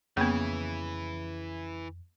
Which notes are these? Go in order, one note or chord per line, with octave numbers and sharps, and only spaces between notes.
F2 C#3 E3 A#3 B3